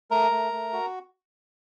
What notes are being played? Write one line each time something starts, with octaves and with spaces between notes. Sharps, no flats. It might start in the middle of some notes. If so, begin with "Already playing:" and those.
A3 A#4 A#5
A3
A3
F#4